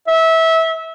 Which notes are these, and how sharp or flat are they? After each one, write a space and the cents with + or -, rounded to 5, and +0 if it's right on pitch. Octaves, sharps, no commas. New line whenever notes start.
E5 -20